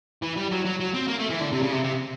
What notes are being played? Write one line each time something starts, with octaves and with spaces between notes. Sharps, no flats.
E3
G3
F#3
F#3
F#3
C4
A#3
A3
E3
D3
C3
C#3
C3
C3